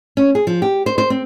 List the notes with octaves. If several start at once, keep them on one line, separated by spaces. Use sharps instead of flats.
C#4
G#4
F3
G4
C5
C5
C4